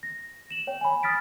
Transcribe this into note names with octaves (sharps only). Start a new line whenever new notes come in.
A#6
E7 F#7
C#5 G5
G#5 B5
D#6 F6 A6 B6 D7